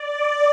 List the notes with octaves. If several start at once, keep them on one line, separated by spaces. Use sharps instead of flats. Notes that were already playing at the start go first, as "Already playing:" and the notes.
Already playing: D5